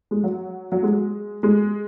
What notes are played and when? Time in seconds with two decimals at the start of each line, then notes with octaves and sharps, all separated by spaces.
0.11 G#3
0.24 F#3
0.72 F#3
0.83 G#3
1.43 G#3